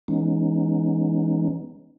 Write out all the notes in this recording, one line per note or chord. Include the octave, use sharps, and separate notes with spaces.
E3 G#3 B3 C#4 D#4